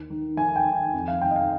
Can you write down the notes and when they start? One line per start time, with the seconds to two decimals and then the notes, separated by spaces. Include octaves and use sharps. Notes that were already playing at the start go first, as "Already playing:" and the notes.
Already playing: D#2
0.10 D#3
0.37 D#2 G#5
0.56 G5
0.65 D#3
0.76 G5
0.94 F2
1.08 F5
1.21 D#3 G5
1.31 D#5
1.36 F5